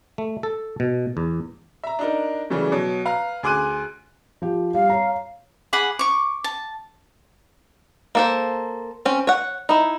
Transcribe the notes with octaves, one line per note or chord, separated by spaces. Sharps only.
A3
A4
B2
E2
E5 A#5
D4 D#4 A#4
C#3 E3 F#3 G3 A3
B2 F#3
B4 F5 A#5 F6
D2 G#4 C6 D6 F#6 D#7
F3 G4
G3 F5
C#5 A#5
G#4 F#5 B5 D6
C#6 D6
A5
A#3 A4 C5
C4 C#4
C#5 F#5
D#4 E4